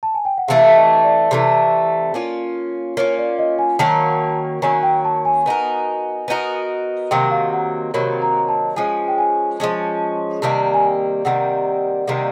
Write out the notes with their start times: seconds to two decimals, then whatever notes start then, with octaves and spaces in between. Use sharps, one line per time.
0.03 A5
0.15 G#5
0.25 G5
0.38 F#5
0.48 C3 E3 A3 F5
0.76 D#5
1.04 D5
1.31 C3 E3 A3
2.14 A#3 C#4 F4
2.97 A#3 C#4 F4 C#5
3.18 D5
3.39 D#5
3.59 G#5
3.79 D#3 F#3 A#3 C#4 A5
4.62 D#3 F#3 A#3 C#4 G#5
4.83 G5
5.05 A5
5.25 G#5
5.46 B3 D#4 F#4 A#4
6.28 B3 D#4 F#4 A#4
7.11 C3 D#3 F#3 A#3 G5
7.31 F5
7.53 F#5
7.94 C3 D#3 F#3 A#3 B5
8.22 A#5
8.49 A5
8.76 F3 G#3 C#4 G#5
9.08 G5
9.18 G#5
9.59 F3 G#3 C#4 A5
10.42 C3 D#3 G3 A#3 A5
10.74 G#5
10.84 G5
11.25 C3 D#3 G3 A#3 F#5
12.08 C3 D#3 G3 A#3